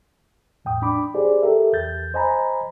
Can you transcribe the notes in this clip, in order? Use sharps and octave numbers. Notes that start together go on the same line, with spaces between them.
E2 A2 G5 D#6
D4 B5 D6
G4 G#4 C5 D5
G4 A4 A#4 E5
E2 G6 A6
C5 D#5 G#5 A#5 B5